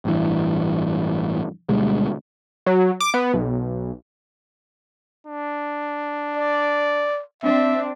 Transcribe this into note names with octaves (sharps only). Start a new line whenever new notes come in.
A1 G2 E3
D2 B2 G3 G#3
F#3
D6
B3
B1
D4
D5
C4 D4 E5